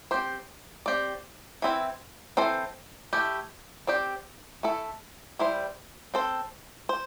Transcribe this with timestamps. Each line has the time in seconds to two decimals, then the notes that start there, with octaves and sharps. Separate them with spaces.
0.11 C4 G4 C5
0.86 C4 G4 D5
1.62 E3 C4 E4
2.37 E3 C4 A4 C5
3.13 A3 E4 G4
3.87 C4 G4 D5
4.63 A3 E4 A4
5.39 G3 E4 C5
6.14 C4 A4 C5
6.89 C5